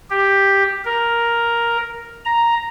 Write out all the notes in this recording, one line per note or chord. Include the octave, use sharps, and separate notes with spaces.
G4
A#4
A#5